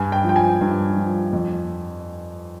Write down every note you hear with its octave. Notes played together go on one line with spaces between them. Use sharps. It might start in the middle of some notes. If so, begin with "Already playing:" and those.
Already playing: G2 G#5
G5
F3 G5
G#5
G2
F3
F2